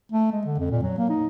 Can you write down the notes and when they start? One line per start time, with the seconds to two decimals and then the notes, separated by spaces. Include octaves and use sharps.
0.12 A3
0.32 G#3
0.45 D3
0.59 F2
0.71 A#2
0.82 F#3
0.98 A#3
1.09 D#4